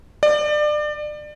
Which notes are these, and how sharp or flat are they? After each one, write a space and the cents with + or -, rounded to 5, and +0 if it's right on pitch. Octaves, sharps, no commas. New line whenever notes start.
D5 +30